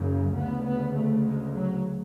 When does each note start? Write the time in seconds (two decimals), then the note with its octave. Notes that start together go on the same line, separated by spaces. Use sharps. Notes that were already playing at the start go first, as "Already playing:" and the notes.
Already playing: F#1 F#2 C#3
0.35 D2 C#3 B3
0.65 B3
0.95 A3
1.25 G#3
1.55 F#3